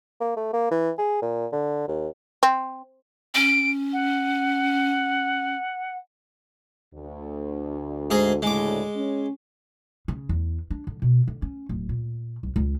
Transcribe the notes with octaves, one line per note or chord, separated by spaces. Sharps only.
A#3
A3
A#3
E3
G#4
A#2
D3
D#2
C4
C#4 D7
F#5
D2
G#2 G#4 D#5
D2 A2 C#3 G#3 D6
C#4
C#3
E2
D4
D3
B2
D3
C#4
D1
A#2
C2
C#2